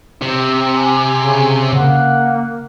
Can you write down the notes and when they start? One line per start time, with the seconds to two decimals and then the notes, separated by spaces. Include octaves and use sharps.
0.22 C3 C4
0.75 G#5
1.17 C#3
1.73 C#3 A#3 F#5